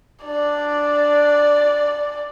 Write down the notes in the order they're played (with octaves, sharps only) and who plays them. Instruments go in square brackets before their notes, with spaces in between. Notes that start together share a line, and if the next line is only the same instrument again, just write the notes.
[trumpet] D4 [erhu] D5